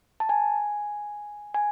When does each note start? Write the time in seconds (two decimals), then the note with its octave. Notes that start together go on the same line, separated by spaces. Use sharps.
0.20 A5
0.29 G#5
1.55 G#5